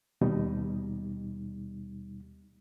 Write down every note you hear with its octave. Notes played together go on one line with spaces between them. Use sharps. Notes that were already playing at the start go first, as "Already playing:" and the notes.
D#2 B2 G3 D#4